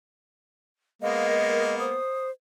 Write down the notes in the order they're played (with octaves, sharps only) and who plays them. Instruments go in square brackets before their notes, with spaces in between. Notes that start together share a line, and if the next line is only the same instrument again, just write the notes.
[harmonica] G#3 A#3 B3 [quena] D#5 [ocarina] F5
[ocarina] A#4
[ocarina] C5 [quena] D#6